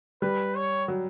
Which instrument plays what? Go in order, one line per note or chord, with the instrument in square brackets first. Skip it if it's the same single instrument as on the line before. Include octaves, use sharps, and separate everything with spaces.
[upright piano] G3 [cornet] B4
[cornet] C#5
[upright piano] F#3